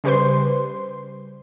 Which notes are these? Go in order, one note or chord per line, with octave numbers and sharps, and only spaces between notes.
C#3 G3 G4 B4 C5 C6